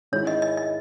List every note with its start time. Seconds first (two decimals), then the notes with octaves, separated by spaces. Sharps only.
0.12 G#2 D#3 G#3 C#4 E4 C#5
0.27 D#5
0.42 D#5
0.57 D#5